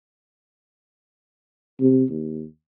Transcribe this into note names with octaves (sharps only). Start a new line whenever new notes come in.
C3
D#2